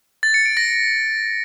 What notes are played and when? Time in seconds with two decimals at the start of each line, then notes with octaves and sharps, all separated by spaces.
0.23 A6
0.34 C#7
0.46 D7
0.57 A#6